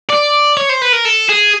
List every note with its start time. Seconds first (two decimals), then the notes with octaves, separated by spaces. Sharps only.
0.09 D5
0.57 C#5
0.69 C5
0.82 B4
0.93 A#4
1.05 A4
1.29 G#4